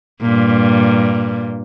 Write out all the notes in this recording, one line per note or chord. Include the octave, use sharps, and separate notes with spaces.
G2 A#2